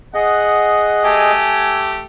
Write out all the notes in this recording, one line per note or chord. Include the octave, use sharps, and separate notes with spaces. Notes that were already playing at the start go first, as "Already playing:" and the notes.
G#4 D#5 F#5
A3 G4 G#5